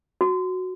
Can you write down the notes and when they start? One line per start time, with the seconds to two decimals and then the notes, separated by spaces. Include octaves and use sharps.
0.21 F#4